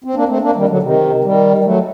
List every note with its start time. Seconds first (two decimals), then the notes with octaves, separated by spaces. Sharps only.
0.04 C4
0.15 A#3 D4
0.29 A3 C4
0.42 A#3 D4
0.56 D#3 G3
0.69 D3 F#3
0.82 C3 D#3
1.24 D#3 G3
1.58 G3
1.64 F#3 A3